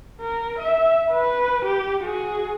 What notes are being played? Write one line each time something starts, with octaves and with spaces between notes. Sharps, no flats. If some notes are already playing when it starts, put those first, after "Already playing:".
A#4
E5
B4
G4
F#4 G#4